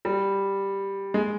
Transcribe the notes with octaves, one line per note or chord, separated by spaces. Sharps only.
G3
G#3